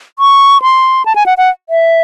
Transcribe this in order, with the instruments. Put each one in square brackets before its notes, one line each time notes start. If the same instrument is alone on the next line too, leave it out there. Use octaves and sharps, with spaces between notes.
[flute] C#6
C6
A5
G#5
F#5
F#5
E5